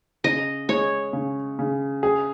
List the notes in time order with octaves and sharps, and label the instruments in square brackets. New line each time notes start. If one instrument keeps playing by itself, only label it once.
[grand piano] C#3 [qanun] D#5
[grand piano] G#3 [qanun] C#5
[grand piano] C#3
C#3
G#4